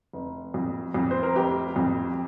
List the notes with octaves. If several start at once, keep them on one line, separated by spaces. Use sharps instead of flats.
F1
F2
F2
C5
A#4
F1 G4
F2